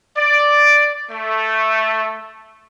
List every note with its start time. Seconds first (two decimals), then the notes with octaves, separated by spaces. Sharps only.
0.17 D5
1.11 A3